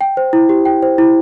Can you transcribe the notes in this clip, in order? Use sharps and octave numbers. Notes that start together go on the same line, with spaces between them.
G5
C5
E4
G4
G5
C5
E4